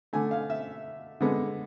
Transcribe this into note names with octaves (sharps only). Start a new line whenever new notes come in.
D3 A3 G#5
F5
E5
D3 G#3 B3